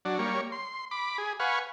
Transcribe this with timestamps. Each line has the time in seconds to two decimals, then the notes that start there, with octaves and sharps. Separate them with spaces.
0.05 F#3 D4
0.19 G3 A#3 C#5
0.52 C6
0.91 B5 D6
1.18 G#4
1.40 B4 F5 F#5 G#5 C#6